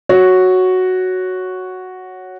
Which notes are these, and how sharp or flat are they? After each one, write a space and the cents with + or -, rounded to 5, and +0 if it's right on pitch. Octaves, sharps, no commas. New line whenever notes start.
F#4 +0 C#5 +0